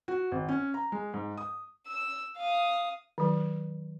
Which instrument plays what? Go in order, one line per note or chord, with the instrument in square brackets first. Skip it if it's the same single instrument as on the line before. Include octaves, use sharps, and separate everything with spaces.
[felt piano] F#4
G#1
C#4
A#5
G#3
G#2
D#6
[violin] E6
F5 D#6
[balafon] D#3 F#3